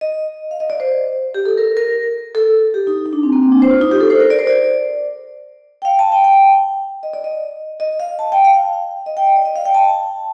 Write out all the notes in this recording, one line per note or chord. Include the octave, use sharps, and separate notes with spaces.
D#5
F5
D#5
D5
C5
G4
A4
A#4
A#4
A4
G4
D#4
D#4
D4
C4
A#3
C4
D4
C5
F4
D#4
G4
A4
C5
A#4
D5
C5
D5
G5
F5
A5
G5
G5
D#5
D5
D#5
D#5
F5
A5
G5
F5
D#5
G5
D#5
D5
D#5
F5
G5
A5